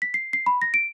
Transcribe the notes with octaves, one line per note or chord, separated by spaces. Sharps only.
B6
C7
C7
B5
A#6
D7